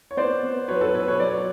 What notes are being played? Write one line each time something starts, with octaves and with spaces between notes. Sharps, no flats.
C#5
B3 C5 D5
B3
F#3 B4 C#5
A4 B4
B2 B4 C#5
B4 C#5
F#3 D5
C#5